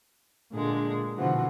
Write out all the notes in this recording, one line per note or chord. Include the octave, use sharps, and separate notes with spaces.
A#2 D3 G#3 D4
B2 D3 E3 F3 F#4